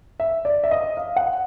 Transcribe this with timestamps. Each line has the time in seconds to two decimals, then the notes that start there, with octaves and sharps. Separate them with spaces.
0.20 E5
0.45 D5
0.64 E5
0.71 D#5
0.97 F5
1.16 F#5